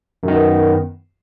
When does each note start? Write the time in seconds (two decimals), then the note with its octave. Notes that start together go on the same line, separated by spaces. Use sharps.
0.23 F#2
0.28 D#3
0.33 B3